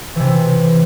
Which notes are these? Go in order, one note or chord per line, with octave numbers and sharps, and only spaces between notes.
C3 E3